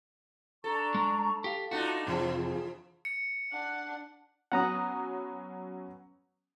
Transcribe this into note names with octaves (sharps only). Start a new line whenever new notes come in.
D4 A4 A#5 C#6
G#3
G4 F5
A3 D4 D#4 F4 F#4
F2 C3 E3 F3 G#4
C#7
D4 F#5
F#3 B3 C#4 F#5 A#5 D#6